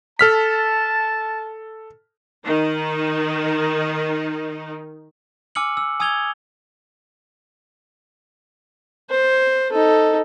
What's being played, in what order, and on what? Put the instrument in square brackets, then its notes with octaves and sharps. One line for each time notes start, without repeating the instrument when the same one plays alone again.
[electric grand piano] A4 F6 B6 [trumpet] A5
[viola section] D#3 D#4
[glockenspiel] G#5 D6 E6 F6 C#7 F#7
E6
G#5 D#6 E6 G#6 F7 G7
[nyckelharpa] C5
D#4 A4